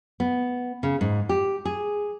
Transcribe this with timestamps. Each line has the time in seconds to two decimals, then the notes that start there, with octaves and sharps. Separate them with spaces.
0.20 B3
0.83 C#3
1.01 G#2
1.29 G4
1.65 G#4